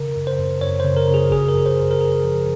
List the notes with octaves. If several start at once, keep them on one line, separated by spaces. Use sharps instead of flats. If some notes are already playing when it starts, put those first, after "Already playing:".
Already playing: C#3 A#4
F#2
C5
F#2
F#2 C#5
C5
C#3
A#4
C#3
G#4
G#1 G#4
A#4
F#2
C5
G#1
A#4
F#2 G#4
F3